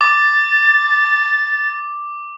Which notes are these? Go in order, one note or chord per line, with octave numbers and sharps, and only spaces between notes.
D6 A6